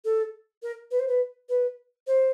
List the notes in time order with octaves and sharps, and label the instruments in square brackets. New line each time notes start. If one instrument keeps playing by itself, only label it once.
[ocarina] A4
A#4
B4
C5
B4
B4
C5